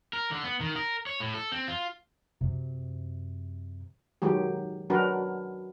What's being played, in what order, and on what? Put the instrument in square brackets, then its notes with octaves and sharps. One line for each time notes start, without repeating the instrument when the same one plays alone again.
[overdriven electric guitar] A#4
D3
B3
D#3
A#4
C#5
A2
A4
C4
F4
[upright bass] F#2 C3
[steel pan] D#3 F#3 G#3 G4
F#3 D4 F#4 A#4 B4